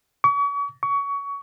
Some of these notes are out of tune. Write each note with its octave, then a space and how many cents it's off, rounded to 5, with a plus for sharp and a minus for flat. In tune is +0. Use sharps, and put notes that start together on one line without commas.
C#6 +40
C#6 +25